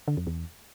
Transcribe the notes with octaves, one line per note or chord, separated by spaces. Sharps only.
D3
F2
E2